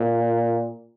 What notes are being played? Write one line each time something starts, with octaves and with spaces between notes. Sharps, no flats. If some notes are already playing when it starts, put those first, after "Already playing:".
Already playing: A#2